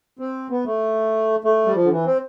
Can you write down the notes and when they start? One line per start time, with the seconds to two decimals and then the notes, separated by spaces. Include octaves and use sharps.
0.19 C4
0.50 B3
0.66 A3
1.44 A3
1.66 G3
1.75 F3
1.83 D3
1.91 E3
2.05 C4